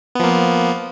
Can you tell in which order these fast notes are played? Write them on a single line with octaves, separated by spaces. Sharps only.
B3 F3 A#3